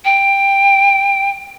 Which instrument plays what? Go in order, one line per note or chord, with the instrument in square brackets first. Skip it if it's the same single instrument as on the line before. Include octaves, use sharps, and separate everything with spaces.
[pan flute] G5